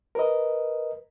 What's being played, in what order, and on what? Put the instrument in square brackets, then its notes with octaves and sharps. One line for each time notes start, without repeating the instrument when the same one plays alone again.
[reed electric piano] A#4 B4 D#5